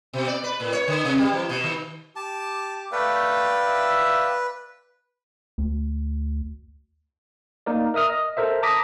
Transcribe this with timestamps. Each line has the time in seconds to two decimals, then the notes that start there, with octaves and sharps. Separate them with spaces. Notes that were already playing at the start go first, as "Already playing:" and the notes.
0.13 B2
0.27 D5
0.44 B4
0.60 A2
0.73 C#5
0.88 D3
1.05 C3
1.18 G3
1.33 E3
1.49 B2
1.64 D#3
2.16 G4 A5 D6
2.92 A3 B4 D5 F5 G5
3.67 E5
5.58 D2
7.66 A#3 D#4 A#4 D5
7.94 A#4 E5 D#6 F6
8.10 D#5
8.37 A4 A#4 C5 E5
8.63 A5 A#5 D6 D#6 A#6 B6